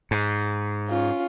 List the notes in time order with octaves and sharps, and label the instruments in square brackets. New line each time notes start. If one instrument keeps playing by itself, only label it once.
[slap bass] G#2
[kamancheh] C#4 F4